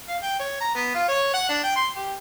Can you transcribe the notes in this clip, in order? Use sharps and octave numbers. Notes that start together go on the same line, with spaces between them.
F5
G5
C#5
A#5
B3
F4
C#5
F#5
D4
G5
C6
G4